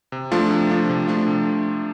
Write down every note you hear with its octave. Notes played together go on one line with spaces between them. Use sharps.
C3
F3 A3 D4 F4
C3
F3 A3 D4 F4
C3
F3 A3 D4 F4
C3